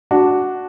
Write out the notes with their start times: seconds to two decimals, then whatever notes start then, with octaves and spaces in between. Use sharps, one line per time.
0.11 D4 F#4